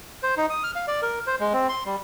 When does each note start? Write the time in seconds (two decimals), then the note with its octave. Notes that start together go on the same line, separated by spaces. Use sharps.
0.23 C5
0.38 D#4
0.50 D#6
0.64 F6
0.76 F5
0.88 D5
1.02 A#4
1.27 C5
1.40 G#3
1.53 C4
1.69 C6
1.86 G3